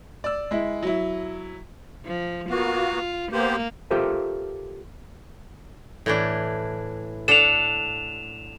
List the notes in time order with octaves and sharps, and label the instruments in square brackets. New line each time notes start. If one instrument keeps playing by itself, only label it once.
[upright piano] D5 E6
G#3 E4
F#3 E4
[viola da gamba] F3
[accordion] A#3 B3 F#4 [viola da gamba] F4
[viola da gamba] A#3 [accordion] B3 G4 C5
[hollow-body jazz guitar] F4 G4 A4 A#4 C5 E5
[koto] A2 E3 D4
[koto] D4 A4 F#5 [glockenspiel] E7 F7